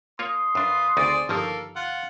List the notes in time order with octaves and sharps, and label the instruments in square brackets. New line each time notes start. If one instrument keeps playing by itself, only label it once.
[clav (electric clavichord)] A#3 F4 C#5 [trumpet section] C6 D#6
[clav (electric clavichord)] F#2 D4 [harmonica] F4 B4
[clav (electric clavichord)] D2 C#3 D#4 [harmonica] C4 G#4 D5
[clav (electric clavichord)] G1 D#3 F3 [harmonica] A#3 A4 A#4
[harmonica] F4 F#5